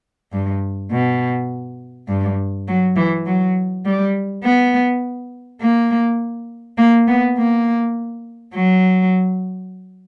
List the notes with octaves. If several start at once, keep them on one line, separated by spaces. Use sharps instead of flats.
G2
B2
G2
F#3
E3
F#3
G3
B3
A#3
A#3
B3
A#3
F#3